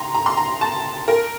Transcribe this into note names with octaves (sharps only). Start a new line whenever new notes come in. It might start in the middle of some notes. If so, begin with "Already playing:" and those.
Already playing: A#5 C6
A#5
C6
A#5
A5
A#4